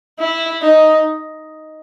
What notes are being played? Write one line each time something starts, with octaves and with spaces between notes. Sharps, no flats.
E4
D#4